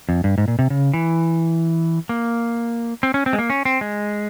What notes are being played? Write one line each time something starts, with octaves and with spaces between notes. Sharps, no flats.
F2
G2
G#2
A#2
C3
C#3
E3
A#3
C4
C#4
C4
G#3
A#3
C#4
C4
G#3